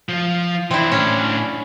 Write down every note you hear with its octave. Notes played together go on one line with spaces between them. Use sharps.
F3 F4
E3 C4 D4 E4
A2 C#4 D4